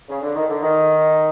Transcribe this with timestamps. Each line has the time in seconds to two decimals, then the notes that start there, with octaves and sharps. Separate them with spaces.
0.08 C#3
0.21 D3
0.35 D#3
0.48 D3
0.61 D#3